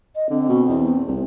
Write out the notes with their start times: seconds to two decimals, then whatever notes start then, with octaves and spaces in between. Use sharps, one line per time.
0.16 D#5
0.30 D3 C4
0.49 B2
0.69 E2
1.08 C2